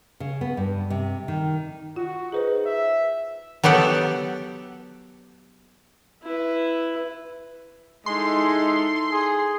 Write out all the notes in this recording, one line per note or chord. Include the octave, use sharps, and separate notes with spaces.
C#3
B3
G2
C3
D#3
F4 F#4
D#4 G#4 B4 C5
E5
F#3 B3 G4 A4 F#5
E4 B4
G#3 D#4 E4 A4 C6
G#4